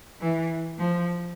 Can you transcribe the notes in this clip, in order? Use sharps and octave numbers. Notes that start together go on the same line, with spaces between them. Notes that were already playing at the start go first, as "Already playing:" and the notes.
E3
F3